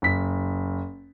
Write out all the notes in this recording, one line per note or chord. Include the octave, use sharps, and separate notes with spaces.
F#1 B6